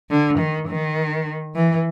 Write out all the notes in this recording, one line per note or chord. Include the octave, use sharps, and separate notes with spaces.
D3
D#3
D#3
E3